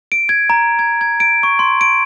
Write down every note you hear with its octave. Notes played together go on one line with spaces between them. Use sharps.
D7
G#6
A#5
G#6
G#6
D7
C#6
C6
D7